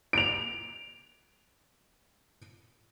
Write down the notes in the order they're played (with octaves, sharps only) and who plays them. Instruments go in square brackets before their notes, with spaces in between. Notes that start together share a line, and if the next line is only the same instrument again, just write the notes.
[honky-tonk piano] D7 F7